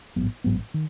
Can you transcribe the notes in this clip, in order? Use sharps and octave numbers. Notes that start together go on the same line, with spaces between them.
A1 G#2 F#3 B3
A1 G#2 F#3 B3
D#3